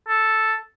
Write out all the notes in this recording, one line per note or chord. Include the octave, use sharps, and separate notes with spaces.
A4